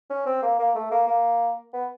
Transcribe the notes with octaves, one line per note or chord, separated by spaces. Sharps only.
C#4
C4
A#3
A#3
A3
A#3
A#3
B3